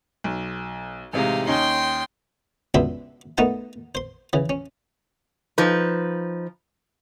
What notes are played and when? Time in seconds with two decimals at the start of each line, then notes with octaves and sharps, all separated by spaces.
0.24 B1
1.13 A1 C3 G#3 D#4 F5
1.47 D#2 C#4 D#4 G5 C6
2.74 C#2 B2 D4 E5 B5 C6
3.38 A3 B3 D#4 A#4 F#5 A5
3.95 C5 C6
4.33 C#3 E3
4.50 C#4
5.58 F3 D#4 B4